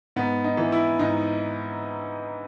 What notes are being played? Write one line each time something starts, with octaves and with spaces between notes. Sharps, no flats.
G#2 B3
D#4
E3
E4
G#2 D#4